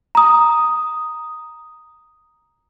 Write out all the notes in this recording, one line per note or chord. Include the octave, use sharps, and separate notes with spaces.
A#5 D#6